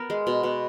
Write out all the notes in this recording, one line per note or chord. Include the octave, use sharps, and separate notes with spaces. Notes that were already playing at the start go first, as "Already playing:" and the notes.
Already playing: B3 A#4
G#3
B2
B2